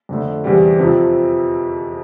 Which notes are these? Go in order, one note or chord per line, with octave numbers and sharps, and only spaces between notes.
F2 D3 A3
E2 C3 G3
F2 C3 F3 C4